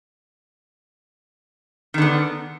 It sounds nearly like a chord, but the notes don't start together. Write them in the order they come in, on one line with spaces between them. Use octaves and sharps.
D#3 D3 B3